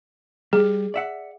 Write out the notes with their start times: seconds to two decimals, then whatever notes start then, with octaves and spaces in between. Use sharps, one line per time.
0.53 G3 G#4
0.94 D5 E5 F#5